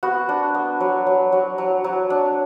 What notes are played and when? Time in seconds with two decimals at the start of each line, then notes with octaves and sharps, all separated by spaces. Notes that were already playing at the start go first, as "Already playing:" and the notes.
0.03 B3 F#4
0.29 D4
0.54 B3
0.80 F#3
1.07 F#3
1.32 F#3
1.58 F#3
1.84 F#3
2.10 D4